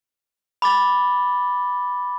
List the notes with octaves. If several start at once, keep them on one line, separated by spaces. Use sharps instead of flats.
B5 D6 A6